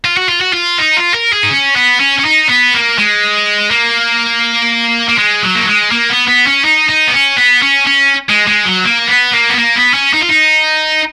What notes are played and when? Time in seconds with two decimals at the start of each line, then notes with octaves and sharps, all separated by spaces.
0.05 F4
0.17 F#4
0.29 F4
0.41 F#4
0.53 F4
0.78 D#4
0.97 F4
1.14 A#4
1.33 G#4
1.44 D#4
1.51 C#4
1.76 B3
2.00 C#4
2.19 C#4
2.24 D#4
2.49 B3
2.74 A#3
2.98 G#3
3.71 A#3
5.09 A#3
5.18 G#3
5.42 F#3
5.55 A#3
5.67 G#3
5.92 A#3
6.10 B3
6.28 B3
6.47 C#4
6.65 D#4
6.89 D#4
7.08 B3
7.13 C#4
7.38 B3
7.62 C#4
7.87 C#4
8.30 G#3
8.47 G#3
8.66 F#3
8.85 A#3
9.08 B3
9.33 A#3
9.50 B3
9.58 A#3
9.76 B3
9.94 C#4
10.13 D#4
10.21 F4
10.29 D#4